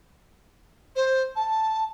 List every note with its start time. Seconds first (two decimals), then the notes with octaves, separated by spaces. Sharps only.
0.95 C5
1.35 A5